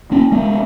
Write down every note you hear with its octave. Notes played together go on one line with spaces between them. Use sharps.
A#3 C#4
G#3 B3